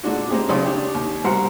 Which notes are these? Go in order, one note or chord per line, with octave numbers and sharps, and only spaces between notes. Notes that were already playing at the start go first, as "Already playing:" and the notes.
A#2 D3 G#3 D4 F#4
G#3 A#3 C4 G4 G#4
B1 C#3 C#5 D5 C6 D#6
D4 G4
D#2
C2 B2 G3 A#4 C5 F#5